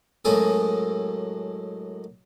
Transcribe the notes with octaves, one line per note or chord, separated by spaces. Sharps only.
F#2 A2 G#3 G#4 A4